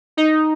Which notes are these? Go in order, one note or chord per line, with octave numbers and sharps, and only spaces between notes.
D#4